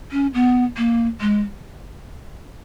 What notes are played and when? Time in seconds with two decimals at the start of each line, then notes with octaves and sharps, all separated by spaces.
0.12 C#4
0.34 B3
0.77 A#3
1.21 G#3